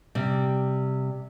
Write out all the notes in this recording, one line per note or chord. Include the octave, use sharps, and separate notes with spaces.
C3 G3